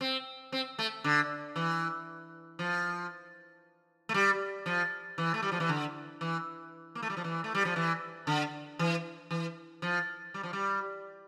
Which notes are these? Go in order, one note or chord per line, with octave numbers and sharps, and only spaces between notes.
C4
C4
A3
D3
E3
F3
A3
G3
F3
E3
A3
G3
F3
E3
D3
E3
A#3
A3
G3
F3
E3
A3
G3
F3
E3
D3
E3
E3
F3
G3
F3
G3